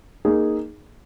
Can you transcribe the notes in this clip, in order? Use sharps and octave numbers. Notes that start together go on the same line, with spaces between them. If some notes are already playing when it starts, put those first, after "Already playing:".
A#3 D#4 G#4